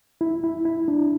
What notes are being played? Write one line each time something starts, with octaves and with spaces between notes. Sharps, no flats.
E4
E4
E4
D4